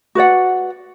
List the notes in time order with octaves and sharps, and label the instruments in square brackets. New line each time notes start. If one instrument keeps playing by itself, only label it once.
[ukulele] F#4 B4 D5 F#5